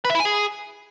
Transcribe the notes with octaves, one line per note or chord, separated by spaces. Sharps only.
B4
E5
E4
G#5
G#4